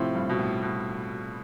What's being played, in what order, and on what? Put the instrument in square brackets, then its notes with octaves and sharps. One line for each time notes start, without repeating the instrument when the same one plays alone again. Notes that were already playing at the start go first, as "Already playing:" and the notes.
Already playing: [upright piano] A2 [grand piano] C3 F3 C4 E4
[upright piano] G2
B2
A2
B2